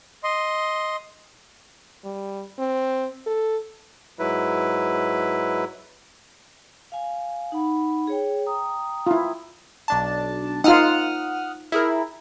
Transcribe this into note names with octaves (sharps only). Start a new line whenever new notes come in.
D#5 C6
G3
C4
A4
G#2 F#3 E4 B4
F5 G#5
D#4 F#5 B5
G#4 C#5 G5
G5 A#5 D#6
E4 F4
B1 D4 A5
D#4 F4 F#5 D#6 F6
E4 G#4 A#4